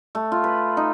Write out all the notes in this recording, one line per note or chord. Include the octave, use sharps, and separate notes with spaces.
A3
F4
B4
D#4